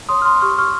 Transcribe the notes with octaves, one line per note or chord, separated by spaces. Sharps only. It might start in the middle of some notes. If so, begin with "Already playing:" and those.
C#5 C6 D#6
F6
C6 D#6
G4 C#6 F6
C#6 F6